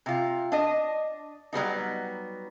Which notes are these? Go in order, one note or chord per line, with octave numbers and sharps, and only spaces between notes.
C3 F4
D4 D#5
F#3 G3 B3 D#4